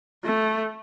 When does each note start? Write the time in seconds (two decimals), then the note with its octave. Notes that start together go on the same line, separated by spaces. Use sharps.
0.25 A3